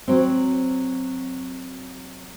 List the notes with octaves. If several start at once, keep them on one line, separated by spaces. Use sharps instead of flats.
F#3 C4